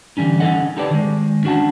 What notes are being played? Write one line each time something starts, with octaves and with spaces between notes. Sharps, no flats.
D3 E3 G3 C#4 D#4
C#4 D#4 G#4 A4 D#5 F#5
D#4 G4 A4 B4 D5
D#3 G#3
C#4 D4 F#4 F#5 A5